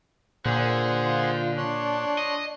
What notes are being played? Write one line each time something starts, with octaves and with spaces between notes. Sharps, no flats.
A#2 D3 G#4 C5 F#5
F4
D4 C#5 C6 F#6
D#5